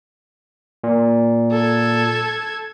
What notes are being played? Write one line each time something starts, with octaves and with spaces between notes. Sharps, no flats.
A#2
A4 G#6